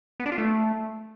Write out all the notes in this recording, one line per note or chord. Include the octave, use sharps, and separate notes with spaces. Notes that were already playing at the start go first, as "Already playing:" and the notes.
B3
D4
F4
A3